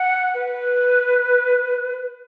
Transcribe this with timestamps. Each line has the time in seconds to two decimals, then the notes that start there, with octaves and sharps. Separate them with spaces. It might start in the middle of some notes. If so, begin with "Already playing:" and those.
Already playing: F#5
0.34 B4